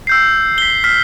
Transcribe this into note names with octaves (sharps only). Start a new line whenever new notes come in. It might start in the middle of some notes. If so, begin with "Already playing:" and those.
E6 G6 C7
B6 G7
F6 B6 C7